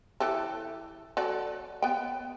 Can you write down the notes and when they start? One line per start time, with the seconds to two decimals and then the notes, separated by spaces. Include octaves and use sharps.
0.20 E3 G4 A4
1.17 F#3 A4 D5
1.82 B3 G5